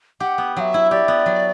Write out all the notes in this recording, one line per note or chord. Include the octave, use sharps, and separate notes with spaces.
G4 F#5
B3
F#3 E5 F#5
E4
G4 D5
B3
F#3